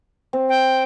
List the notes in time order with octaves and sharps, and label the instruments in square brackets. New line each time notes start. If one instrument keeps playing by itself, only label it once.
[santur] C4
[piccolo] G5